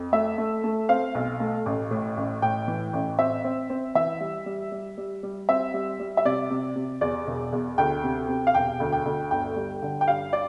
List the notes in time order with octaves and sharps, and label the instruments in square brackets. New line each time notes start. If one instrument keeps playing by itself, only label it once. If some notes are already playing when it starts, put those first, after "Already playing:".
Already playing: [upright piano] F2
A3 E5
A3
A3
C4 F5
B1
A3
A1
A2
A1
A2 G5
E3
A1
C4 E5
C4
C4
E3 E5
G3
G3
G3
G3
G3
C4 E5
G3
G3
E5
C3 D5
C3
C3
E2 D5
E1
E2
D2 G5
C3
C3
F5
E1 G5
D2
G5
D2
G1 G5
G3
D3
G5
G2 F5
D5